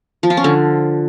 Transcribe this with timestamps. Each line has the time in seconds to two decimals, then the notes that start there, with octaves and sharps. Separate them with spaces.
0.23 F3
0.30 F4
0.37 C#4
0.44 D3